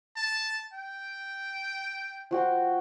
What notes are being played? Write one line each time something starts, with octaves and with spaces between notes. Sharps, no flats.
A5
G5
F3 F#4 G5